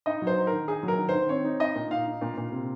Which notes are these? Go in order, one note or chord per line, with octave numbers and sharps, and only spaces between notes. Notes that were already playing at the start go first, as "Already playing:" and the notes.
D#4 D#5
F#3
C5
D#4
A#4
D#3
D#4 G#4
F#3
A#4
D#3
C5
D#3
C4 C#5
D#4
D#4 D#5
A#2
D#4 F5
D#4
A#2
A#2
C3